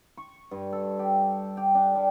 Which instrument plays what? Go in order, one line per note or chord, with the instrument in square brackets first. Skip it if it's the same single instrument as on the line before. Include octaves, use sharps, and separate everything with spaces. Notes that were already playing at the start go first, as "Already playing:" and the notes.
[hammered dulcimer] C#6
G2
A4
G4
G4
D4
G3